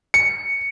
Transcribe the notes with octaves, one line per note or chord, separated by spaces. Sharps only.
C#7